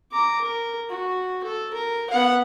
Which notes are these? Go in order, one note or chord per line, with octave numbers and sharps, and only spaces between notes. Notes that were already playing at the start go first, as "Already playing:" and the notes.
A#5 D6
A#4
F#4
A4
A#4
B3 F#5